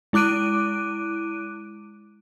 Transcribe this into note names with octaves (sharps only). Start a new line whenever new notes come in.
G#3 E4 D6 F#6 D7 D#7